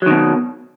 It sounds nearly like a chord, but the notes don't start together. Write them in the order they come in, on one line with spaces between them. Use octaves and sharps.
F#3 D#3 B2